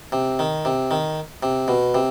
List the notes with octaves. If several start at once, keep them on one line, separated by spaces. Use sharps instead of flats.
C3
D#3
C3
D#3
C3
B2
C3